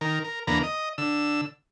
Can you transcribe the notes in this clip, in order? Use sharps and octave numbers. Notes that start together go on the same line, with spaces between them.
D#3 A#4
A#4
E2 D3 A#3 B3 A#5
D#5
D3 E6